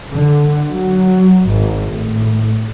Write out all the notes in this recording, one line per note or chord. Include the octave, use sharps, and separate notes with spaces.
D3
F#3
G#1
A2